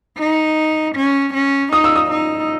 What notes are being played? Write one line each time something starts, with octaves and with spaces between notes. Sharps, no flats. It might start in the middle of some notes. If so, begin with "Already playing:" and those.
D#4
C#4
C#4
D#4 D#6
E6
D#6
D#4